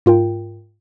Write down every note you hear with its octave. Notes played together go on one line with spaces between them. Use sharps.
G#2 F4 A#4 G5